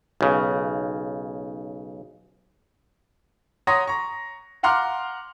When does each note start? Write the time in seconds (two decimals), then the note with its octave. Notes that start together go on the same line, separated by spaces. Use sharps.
0.21 B1 C#3
3.67 C#5 F#5 A#5 C6 D#6 A#6
3.87 A#5 C#6
4.63 F5 F#5 A#5 C6 D6 F6